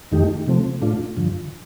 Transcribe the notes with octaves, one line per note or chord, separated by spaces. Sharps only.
F2 D#3 A3 D#4 G4
C3 F3 A3 C4
A2 A3 D4 F4
G2 D3 F3